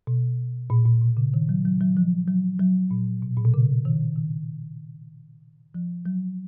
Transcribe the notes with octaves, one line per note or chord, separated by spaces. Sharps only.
B2
A#2
A#2
B2
C#3
D#3
F#3
F#3
F#3
F3
F#3
F#3
A#2
B2
A#2
B2
C#3
D#3
D#3
F3
F#3